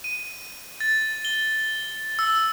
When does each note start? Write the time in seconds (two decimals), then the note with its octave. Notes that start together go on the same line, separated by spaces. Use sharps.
0.04 D#7
0.81 A6
1.25 G7
2.19 E6